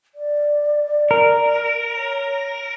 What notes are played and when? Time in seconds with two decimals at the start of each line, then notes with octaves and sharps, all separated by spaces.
0.15 D5
1.11 A#4
1.96 C#5